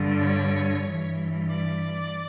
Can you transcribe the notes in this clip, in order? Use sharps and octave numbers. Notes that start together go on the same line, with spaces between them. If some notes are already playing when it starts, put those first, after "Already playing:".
Already playing: G2 D3
C#5
G2 E3
D5